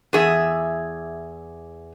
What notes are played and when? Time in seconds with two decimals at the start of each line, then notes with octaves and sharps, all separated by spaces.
0.13 E2 G#4 E5